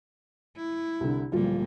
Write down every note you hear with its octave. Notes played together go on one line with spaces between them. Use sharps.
E4
C2 D3
D1 A#2 F3 G3 F4